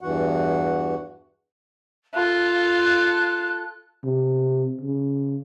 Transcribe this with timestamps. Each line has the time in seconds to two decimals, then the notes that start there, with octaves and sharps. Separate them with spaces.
0.01 E2 G2 E3 F#4 F#5
2.14 F4 A4 F#6
4.05 C3
4.81 C#3